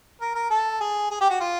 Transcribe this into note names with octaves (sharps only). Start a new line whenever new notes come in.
A#4
A#4
A4
G#4
G#4
G4
F#4
F4